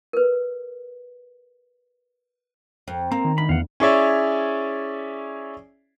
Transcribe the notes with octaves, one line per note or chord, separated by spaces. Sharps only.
A#4 B4
F2
A#3 C4 A#5
D#3
D2 B5
E2 F5 F#5
C#4 E4 G#4 C#5 D5 E5